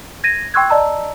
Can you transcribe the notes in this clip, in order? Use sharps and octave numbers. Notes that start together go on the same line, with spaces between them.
G#6 A#6 D#7
G5 C6 C#6 E6 F#6 G#6
D5 D#5 A5 A#5 E6